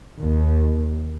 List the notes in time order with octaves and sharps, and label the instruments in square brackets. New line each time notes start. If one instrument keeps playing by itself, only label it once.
[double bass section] D#2